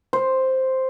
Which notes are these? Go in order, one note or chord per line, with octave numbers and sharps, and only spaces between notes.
C5